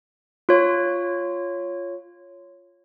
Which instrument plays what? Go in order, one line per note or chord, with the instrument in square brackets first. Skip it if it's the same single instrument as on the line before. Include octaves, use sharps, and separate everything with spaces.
[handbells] F4 C#5